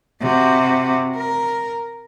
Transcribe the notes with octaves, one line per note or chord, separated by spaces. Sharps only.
C3 F#4
A#4